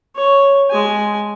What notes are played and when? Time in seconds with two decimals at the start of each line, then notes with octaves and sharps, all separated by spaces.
0.16 C#5
0.70 G#3 G#5